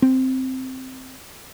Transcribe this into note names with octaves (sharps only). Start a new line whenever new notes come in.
C4